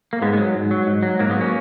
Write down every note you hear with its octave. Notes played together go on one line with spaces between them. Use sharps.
A#3
G#2 G#3 B3
F#3 G#3 B3
G#2
F#3
G#2
F#3
G#2 F#3 A#3
G#3 B3
F#3 A#3 C#4